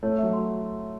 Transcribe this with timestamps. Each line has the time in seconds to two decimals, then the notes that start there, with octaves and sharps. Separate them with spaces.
0.03 A3 C#5
0.18 F#3 E5
0.33 C6